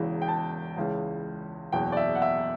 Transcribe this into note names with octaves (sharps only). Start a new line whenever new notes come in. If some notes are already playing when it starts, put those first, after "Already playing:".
Already playing: E1 E2 C#3 E3
G5
A5
C#2 C#3 E3
F#1 E2 B2 G5
D5
E5
F#5
E5